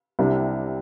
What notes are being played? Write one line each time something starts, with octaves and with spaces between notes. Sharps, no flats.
C2 C3 G3 D4